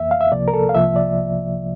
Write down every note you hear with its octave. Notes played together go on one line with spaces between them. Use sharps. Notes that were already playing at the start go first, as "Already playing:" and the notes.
Already playing: F2 E3 A#3 E5
F5
E5
C2 C3 F3 A#3 D5
A#4
A4
F5
C2 C3 F3 A#3 E5
D5